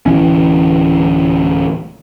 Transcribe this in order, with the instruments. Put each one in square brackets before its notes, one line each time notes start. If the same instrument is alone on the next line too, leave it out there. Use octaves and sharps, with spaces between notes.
[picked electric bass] D1 B1 E3 C#4